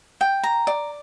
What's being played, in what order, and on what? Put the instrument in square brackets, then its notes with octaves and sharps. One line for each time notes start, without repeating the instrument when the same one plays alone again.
[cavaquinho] G5
A#5
D5